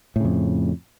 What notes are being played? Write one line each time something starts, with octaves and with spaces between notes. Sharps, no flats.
F2 A2 C#3